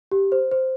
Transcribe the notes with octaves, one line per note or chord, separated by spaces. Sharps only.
G4
C5
C5